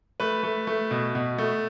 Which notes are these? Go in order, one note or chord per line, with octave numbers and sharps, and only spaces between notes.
A3 B4
A3
A3
B2
B2
A3